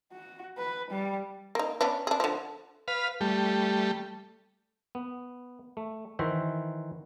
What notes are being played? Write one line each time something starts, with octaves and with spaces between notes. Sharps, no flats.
F#4
B4
G3
A#3 D#4
B3 C#4 D4
D4 G#4
D3 F3
B4 F5
G3 A3
B3
A3
D#3 E3 F#4 C5 E5